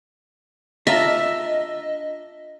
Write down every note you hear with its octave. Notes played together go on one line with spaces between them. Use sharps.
D4 F4 D#5 E5 A#5